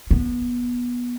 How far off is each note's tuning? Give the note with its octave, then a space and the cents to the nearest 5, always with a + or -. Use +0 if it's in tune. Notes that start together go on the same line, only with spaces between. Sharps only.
B3 -20